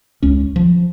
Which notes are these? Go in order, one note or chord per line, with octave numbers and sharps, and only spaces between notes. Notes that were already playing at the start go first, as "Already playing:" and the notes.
C#2 C#4
F3